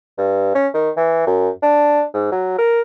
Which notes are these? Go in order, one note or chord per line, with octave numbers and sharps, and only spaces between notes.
G2
C#4
D#3
E3
F#2
D4
G#2
F#3
A#4